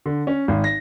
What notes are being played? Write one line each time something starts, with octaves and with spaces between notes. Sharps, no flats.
D3
C#4
G#1
A#6